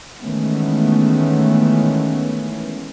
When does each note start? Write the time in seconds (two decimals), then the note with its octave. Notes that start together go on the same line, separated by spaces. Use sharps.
0.22 D#3 E3 G#3 A3 B3 C#4